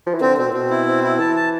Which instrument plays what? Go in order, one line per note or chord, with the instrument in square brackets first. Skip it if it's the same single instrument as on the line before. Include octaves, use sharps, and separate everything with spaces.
[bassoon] F3
E3
[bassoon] D3 [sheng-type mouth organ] C4
[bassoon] B2 [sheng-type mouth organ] C4
[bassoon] A2
[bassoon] B2 [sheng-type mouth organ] C4
[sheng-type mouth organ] E4
C4
E4
[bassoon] E3 [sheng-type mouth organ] A5
[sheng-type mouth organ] A5